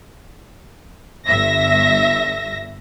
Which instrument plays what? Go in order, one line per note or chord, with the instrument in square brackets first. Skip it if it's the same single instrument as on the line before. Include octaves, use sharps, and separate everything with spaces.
[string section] G1 G2 E5 A#6